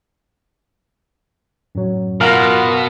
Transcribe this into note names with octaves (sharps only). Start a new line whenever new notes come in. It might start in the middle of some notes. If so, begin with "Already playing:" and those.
F#2 A2 F#3
B2 F4 A#4 F5 F#5